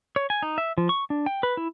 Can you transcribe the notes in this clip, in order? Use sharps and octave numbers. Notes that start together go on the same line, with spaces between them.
C#5
G#5
D#4
E5
F3
C#6
D4
G5
B4
E4